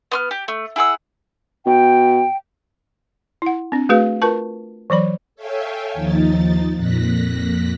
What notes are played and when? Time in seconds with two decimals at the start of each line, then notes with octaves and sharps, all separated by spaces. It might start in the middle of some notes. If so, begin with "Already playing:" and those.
0.12 B3 C6 F6
0.31 G4
0.48 A3
0.76 E4 G#4 F#5 E6
1.66 B2 G5
3.42 E4 F#5
3.72 C4 D4
3.89 A3 F#4 G#4 B4 F5
4.22 F4 A#4 B4 A5 C#6
4.90 E3 F#3 D5 B5
5.35 A4 C#5 E5 F5 G5 G#5
5.94 D#2 F3 D#4 A6
6.76 F2 A#2 F#6 A#6 B6